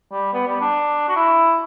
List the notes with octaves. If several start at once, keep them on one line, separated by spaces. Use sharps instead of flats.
G3
B3
G3
D4
F#4
E4